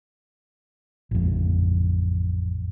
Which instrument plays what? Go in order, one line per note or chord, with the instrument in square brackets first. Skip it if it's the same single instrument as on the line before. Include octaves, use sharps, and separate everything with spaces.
[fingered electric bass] A1 F2